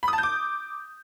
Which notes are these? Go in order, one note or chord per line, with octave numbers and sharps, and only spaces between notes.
B5
D#6
A5
G6
D6